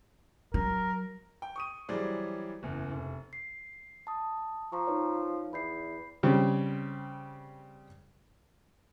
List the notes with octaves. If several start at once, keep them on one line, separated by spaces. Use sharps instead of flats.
F#3 A#4
G5
C#6 D#6 D#7
E3 F#3 G3 G#4 C5 D5
F#1 E2
F1
C7
A5 D#6
F3 A#5 C#6
D#4 B4 C#5
E2 B5 G6 C7
C#3 G3 C4